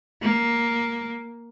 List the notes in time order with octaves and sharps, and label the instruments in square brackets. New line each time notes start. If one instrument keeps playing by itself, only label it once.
[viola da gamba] A#3